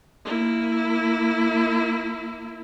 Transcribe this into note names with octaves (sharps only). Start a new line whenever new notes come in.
A#3 E4